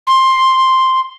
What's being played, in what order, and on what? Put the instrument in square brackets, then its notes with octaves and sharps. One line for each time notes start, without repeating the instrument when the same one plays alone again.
[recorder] C6